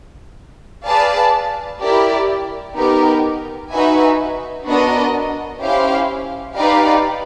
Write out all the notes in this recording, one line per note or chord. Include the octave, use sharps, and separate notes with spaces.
G#4 B4 D5 F5 A5
E4 G4 A#4 D5
B3 D#4 G4 A#4
D#4 F#4 B4 E5 G#5
B3 D4 F#4 A#4 D#5
C#4 E4 G4 C5 F5
D#4 G4 B4 D5 F5